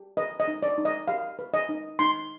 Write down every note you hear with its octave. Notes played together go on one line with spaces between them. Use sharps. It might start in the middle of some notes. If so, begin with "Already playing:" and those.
Already playing: G4
B4 D#5
D#5
D#4
D5
D#4
D#5
G4 F5
B4
D#5
D#4
D#4 C6